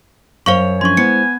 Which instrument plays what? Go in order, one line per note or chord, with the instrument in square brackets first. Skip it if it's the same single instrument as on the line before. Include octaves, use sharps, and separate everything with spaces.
[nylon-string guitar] F#2 C#5 [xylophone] C5 F5 C#6
[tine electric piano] F3 C#4 D4 [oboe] G#5 [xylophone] C6 C#6
[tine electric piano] G#3 E4 C5 [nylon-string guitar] B3 [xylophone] C#7